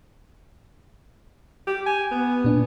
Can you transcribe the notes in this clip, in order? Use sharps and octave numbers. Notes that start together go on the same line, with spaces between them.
G4
G#5
B3
A#2 D4